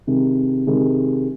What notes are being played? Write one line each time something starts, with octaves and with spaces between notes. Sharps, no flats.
C3 D#3 G#3
C3 D#3 G#3